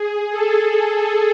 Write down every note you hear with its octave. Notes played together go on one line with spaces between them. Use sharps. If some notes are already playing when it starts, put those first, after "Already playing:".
Already playing: G#4
A4